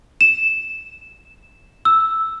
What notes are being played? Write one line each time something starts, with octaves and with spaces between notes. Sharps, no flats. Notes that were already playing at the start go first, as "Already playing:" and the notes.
E7
E6